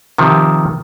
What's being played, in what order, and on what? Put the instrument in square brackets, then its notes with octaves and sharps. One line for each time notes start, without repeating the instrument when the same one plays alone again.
[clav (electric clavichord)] C3 D#3 F3